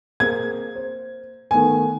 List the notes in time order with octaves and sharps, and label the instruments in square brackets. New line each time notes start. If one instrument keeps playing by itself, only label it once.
[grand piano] A#3 C4 G#4 [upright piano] G#6
[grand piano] C5
[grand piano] D#3 A3 B3 [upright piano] G#5